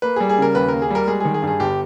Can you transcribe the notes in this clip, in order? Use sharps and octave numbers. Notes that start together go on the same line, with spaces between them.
A#3 B4
G3 G#4
G#4
C#3 A#4
D#2 B4
A#3 A#4
G#4
G3 A#4
G#3 G#4
D#3 G#4
G#4
G2
G#4
G1 G4